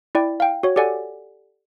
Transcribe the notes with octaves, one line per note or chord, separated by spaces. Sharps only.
E4 D5 G5
F5 G5
F#4 C#5
G4 A4 D5 F#5 G#5